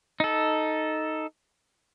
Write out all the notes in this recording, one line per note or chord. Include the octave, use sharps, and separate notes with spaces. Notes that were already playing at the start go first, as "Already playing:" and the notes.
D#4 A4